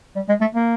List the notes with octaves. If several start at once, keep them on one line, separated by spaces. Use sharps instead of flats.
G3
G#3
A3
A#3